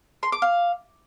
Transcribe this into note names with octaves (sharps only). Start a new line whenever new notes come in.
C6
D6
F5